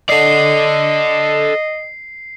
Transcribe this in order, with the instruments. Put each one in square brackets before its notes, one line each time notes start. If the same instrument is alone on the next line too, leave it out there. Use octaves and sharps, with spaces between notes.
[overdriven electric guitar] A4 D5 [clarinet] D#5 [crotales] C7